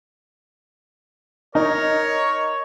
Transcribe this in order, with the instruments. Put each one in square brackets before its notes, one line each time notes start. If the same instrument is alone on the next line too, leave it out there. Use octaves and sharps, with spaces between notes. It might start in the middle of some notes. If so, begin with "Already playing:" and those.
[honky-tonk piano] D#4 [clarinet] A#4 [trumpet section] C#5